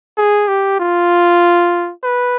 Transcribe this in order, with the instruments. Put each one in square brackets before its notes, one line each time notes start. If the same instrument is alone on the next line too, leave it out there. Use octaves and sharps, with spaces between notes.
[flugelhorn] G#4
G4
F4
B4